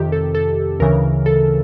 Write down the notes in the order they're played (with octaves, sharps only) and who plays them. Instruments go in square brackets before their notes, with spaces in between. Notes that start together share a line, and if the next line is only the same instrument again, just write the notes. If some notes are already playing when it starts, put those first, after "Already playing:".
Already playing: [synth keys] F2 C3 D#3 G4
A4
A4
D2 C#3 E3 A#4
A4